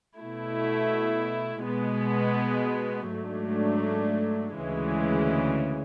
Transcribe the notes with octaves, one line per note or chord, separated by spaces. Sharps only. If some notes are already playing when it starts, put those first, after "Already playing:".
B2 A3 E4
B2 G#3 B3
G#2 F#3 A3 D4
D2 C#3 E3 G#3